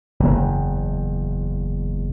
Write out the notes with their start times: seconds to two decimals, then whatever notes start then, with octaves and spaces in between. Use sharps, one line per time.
0.20 F#1 E2